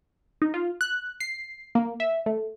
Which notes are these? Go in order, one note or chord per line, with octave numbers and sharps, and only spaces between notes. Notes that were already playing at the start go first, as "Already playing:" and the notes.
D#4
F4
F#6
C7
A#3
E5
A3